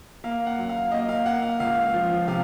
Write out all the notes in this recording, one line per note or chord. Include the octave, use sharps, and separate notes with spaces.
A#3 F5
F#5
F#2
F5
A#3 D#5
F5
A#3 F#5
F5
C#2 F5
F3
C3 F5